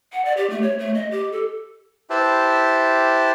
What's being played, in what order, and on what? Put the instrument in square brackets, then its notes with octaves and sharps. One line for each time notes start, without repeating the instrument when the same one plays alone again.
[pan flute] F#5
D5
G4
A3
C#5
A3
D#5
G4
A4
[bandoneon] E4 G4 B4 C5 E5 A5